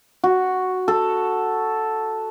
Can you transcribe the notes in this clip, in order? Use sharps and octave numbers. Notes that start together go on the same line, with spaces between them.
F#4
A4